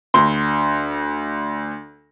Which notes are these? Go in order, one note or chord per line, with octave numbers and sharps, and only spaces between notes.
D2 C6